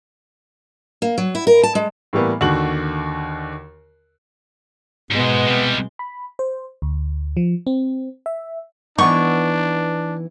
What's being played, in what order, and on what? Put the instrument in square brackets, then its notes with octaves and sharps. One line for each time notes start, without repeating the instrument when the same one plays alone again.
[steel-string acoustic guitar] A#3
F#3
E4
A#4
A5
G#3
[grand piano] A2 E3 G3 A#3 B3
D#2 D3 F#4 F#7
[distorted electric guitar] G#2 [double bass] B2 G#3 [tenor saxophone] B3
[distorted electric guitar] C3 G3
[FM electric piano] B5
C5
D2
F3
C4
E5
[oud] E3 B3 D#4 [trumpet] D4 [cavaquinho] C#6